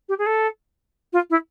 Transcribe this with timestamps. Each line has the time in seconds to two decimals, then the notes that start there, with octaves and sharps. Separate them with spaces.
0.08 G4
0.18 G#4
0.26 A4
1.12 F4
1.30 E4